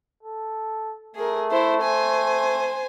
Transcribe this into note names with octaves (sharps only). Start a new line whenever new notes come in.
A4
A3 G#4 A#4
E4 C5
C5 G#5